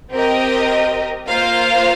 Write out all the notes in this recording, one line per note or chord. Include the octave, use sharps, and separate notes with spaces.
C4 G4 A#4 D#5
A#3 F4 C5 F5